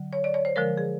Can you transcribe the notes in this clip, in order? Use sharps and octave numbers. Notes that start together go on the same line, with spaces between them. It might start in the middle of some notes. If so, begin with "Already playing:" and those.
Already playing: D3 F#3
C#5
D5
C#5
C5
D3 F3 G#3 A#4
G#4